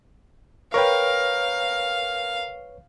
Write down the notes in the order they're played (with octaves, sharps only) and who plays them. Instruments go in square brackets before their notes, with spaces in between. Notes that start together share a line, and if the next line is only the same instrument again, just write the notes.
[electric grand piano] A#4 G5 [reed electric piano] B4 C#5 C#6 [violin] F5